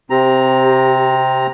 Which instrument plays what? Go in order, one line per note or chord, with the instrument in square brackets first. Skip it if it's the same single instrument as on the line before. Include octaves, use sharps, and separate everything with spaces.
[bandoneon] C3 C4 A#5 [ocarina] G4